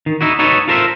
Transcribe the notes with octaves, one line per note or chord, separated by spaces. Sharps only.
D#3
D#4 E4 F#4
D#4 F#4 A4 B4 C#5
F4 A4 A#4 C5 E5